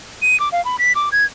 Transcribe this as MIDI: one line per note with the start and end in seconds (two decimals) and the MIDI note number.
0.22 0.39 99
0.40 0.49 86
0.52 0.63 77
0.65 0.77 83
0.79 0.92 95
0.95 1.09 86
1.12 1.24 92